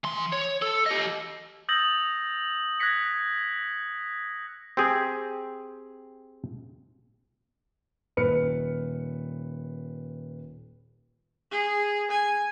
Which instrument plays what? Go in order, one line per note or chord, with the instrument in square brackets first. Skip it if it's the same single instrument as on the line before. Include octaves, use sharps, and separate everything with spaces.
[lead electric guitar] E3 C6
C#5
A4
G4 D#5
[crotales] D#6 E6 G6 A6 A#6 F#7
F#6 G#6 A#6 B6 C#7
[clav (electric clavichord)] C4 G4 G#4
[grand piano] D#1 B4 F6 C#7
[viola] G#4
G#5